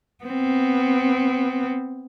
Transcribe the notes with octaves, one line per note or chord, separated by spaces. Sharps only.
B3 C4